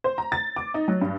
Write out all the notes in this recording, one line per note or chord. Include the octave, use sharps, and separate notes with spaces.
C5
A#5
A6
D6
D#4
F#3
G2